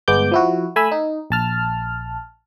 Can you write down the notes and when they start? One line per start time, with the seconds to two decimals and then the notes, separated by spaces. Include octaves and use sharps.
0.08 G1 G#3 B3 D6 G6
0.32 F3 E4 F#4
0.76 A3 G#5 B5 E6
0.92 D#4
1.30 A#1 A5 F6